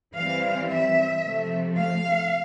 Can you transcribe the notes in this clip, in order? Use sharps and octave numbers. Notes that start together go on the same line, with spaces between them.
E3 G3 C4 F5
E5
C3 F3 A3
F5